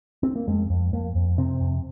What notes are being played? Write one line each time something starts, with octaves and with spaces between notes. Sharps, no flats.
C4
A#3
F2 G#3
F2
F2 A#3
F2
C3 C4
F2